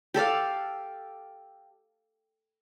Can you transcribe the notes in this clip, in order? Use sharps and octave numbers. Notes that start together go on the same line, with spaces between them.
G4 A4 D5 F5